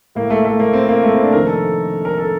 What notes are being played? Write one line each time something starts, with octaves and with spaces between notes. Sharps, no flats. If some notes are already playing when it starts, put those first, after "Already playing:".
A2 A#3
A3
A3
A#3
C4
A#3
A3
C4
D4
F2 C3 D#3 A#4
A4
A#4
A4